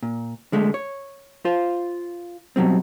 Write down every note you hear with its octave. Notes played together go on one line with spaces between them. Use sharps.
A#2
D3 G#3 A3
C#5
F4 C5
B2 F#3 G3 C4